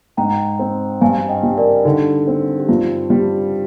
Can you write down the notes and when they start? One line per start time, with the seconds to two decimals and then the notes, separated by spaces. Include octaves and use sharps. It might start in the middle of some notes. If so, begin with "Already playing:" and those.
0.17 G#2 G5 A#5
0.59 C4
1.01 G2 F5 G#5
1.29 D#5 G5
1.43 G3
1.58 A#4 D5
1.85 D3 D#4
2.27 C4
2.59 G4
2.69 G2 F4
3.10 G3 G4